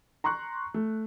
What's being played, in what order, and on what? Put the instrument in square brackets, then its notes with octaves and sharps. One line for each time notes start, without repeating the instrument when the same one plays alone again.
[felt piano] A#5 C6 C#6 F#6
A3